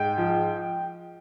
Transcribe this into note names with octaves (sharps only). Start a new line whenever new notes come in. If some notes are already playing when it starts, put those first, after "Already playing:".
Already playing: G#2 G5
F3